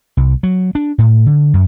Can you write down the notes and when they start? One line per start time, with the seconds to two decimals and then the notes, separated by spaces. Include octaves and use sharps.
0.17 C2
0.43 F#3
0.75 D4
0.98 A2
1.26 D3
1.54 F#2